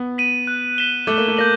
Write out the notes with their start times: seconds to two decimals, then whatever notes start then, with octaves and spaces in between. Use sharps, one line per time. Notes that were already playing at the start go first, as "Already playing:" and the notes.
Already playing: B3
0.18 B6 D#7 F#7
0.47 F#6
0.78 B6 E7 G7
1.07 A3 D6
1.18 A#3
1.28 A3
1.37 A#3 G6 A#6 D#7 F#7